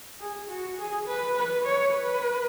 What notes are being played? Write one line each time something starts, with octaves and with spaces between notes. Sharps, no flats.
G#4
F#4
G#4
B4
B4
C#5
B4